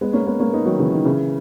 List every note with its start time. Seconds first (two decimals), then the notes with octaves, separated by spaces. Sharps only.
0.01 G#3 B3
0.13 A#3 C#4
0.26 G#3 B3
0.39 A#3 C#4
0.53 B3 D#4
0.66 D#3 F#3
0.79 C#3 E3
0.93 D#3
1.05 C#3 E3